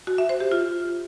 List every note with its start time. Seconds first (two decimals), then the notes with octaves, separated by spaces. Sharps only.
0.07 F#4
0.18 E5
0.29 C5
0.40 G4
0.51 F4